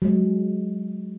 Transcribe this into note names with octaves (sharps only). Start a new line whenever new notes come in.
F#3 G#3